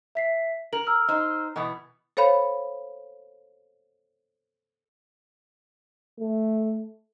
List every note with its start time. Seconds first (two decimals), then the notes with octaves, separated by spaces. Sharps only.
0.15 E5 B6 C7
0.73 A#4 F#7
0.87 A#5 E6 F6
1.08 D#4 C5
1.56 B2 E3 B3
2.17 A4 C5 C#5 F5 B5
6.20 A3